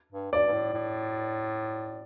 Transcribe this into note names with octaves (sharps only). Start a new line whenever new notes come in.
G2
G2 D5
G2
A2
A2